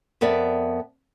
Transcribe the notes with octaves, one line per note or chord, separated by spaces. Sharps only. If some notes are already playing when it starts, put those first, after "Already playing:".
F2 B3 A#4 D5 E5